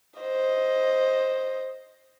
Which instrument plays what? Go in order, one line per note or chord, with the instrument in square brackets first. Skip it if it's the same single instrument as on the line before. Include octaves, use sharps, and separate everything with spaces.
[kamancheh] C5 D#5